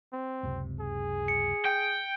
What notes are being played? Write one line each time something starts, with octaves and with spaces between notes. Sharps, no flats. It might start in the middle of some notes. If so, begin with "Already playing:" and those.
C4
F#1 C#2 C3
G#4
C#7
G5